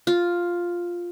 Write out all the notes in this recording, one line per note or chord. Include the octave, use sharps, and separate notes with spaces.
F4